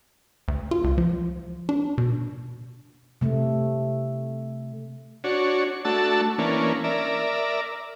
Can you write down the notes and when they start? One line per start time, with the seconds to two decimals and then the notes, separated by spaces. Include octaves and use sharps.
0.48 D2
0.71 F4
0.84 C#2
0.98 F3
1.69 D4
1.98 B2
3.21 C3 A3
5.24 D4 F#4 C#5
5.85 A3 D4 F#4 A5 E6
6.38 E3 A#3 C#4 D4
6.84 A#4 D5 E5